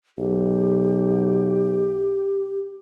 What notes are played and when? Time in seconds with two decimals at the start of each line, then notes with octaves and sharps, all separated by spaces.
0.18 B1 G4